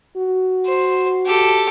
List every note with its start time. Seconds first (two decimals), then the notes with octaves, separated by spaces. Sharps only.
0.17 F#4
0.66 C5
1.26 G4 A4